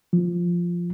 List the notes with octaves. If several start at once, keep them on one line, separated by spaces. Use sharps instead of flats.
F3